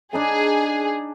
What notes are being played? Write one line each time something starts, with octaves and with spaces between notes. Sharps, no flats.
D4 D#4 G#4 A5